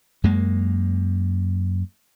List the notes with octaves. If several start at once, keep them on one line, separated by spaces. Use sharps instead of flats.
F#2 G#3 A#3